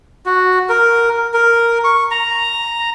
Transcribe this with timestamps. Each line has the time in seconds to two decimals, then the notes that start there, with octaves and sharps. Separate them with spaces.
0.26 F#4
0.69 A#4
1.34 A#4
1.84 C#6
2.11 A#5